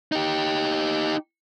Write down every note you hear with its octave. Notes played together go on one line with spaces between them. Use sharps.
D#4 G4